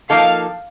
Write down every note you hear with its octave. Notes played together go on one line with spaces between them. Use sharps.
F3 A#3 D#4 A4 F5